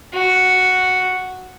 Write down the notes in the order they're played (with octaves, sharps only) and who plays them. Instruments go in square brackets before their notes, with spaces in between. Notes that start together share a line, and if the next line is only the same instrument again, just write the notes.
[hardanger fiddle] F#4